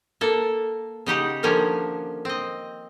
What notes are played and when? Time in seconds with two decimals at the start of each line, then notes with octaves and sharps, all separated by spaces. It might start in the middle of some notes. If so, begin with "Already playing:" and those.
0.21 A#3 A4
1.06 C#3 D#4 G4 F#5
1.43 D3 D#3 F3 A#3 C#4 D4
2.25 C4 D#5